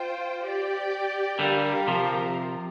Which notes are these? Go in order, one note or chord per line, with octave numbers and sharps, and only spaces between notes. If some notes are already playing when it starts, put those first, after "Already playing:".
Already playing: F4 C5 G5
G4 D5 G5
D3 G3 G4 A#4 F5
C3 F3